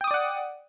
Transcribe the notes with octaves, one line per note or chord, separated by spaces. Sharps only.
D5 F#5 G5 D6 D#6